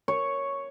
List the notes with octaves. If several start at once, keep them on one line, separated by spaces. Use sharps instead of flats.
C#5